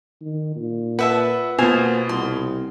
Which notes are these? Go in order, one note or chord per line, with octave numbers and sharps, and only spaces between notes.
D#3
A#2
B4 E5 F#5 A5
B2 A#3 B3 F4 C5 G#5
C2 C6